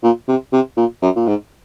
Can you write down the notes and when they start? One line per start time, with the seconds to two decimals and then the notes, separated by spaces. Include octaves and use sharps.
0.03 A#2
0.28 C3
0.53 C3
0.77 A#2
1.02 F#2
1.16 A#2
1.27 G#2